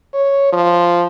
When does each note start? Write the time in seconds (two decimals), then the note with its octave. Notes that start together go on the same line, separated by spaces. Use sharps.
0.13 C#5
0.52 F3